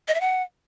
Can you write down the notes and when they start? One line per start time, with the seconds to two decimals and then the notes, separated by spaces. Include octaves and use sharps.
0.08 D#5
0.14 E5
0.21 F#5